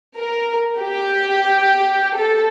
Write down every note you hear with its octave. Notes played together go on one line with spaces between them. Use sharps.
A#4
G4
A4